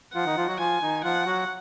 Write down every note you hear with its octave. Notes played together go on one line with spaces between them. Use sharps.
F3 F4 F#5
D#3 D#4
F3 F4
F#3 F#4
F3 F4 G#5
D#3 D#4
F3 F4 F#5
F#3 F#4